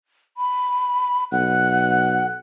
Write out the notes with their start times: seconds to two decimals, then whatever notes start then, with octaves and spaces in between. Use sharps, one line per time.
0.37 B5
1.32 B1 F#5 F#6